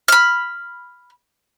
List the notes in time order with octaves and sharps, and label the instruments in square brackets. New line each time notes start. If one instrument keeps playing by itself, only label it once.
[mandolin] B5 F6